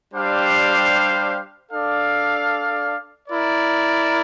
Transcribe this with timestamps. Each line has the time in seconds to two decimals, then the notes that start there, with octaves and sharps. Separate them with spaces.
0.14 G3 D4 G4 C5 F5
1.71 D4 A4 D5 F5
3.26 E4 A#4 D5